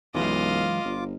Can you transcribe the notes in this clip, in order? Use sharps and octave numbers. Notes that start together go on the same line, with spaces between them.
B1 F#2 E3 G#3 F4 D#5 F5 D6
G1